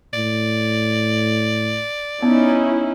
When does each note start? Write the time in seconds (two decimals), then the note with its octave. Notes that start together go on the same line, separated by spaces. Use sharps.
0.14 A2 D5
2.23 B3 C#4 D#4 E4